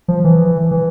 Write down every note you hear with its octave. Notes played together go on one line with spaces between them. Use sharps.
F3
E3
E3